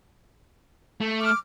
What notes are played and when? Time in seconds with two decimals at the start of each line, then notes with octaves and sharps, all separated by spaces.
1.01 A3
1.20 D6 F6